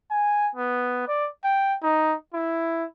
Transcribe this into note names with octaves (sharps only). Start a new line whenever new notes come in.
G#5
B3
D5
G5
D#4
E4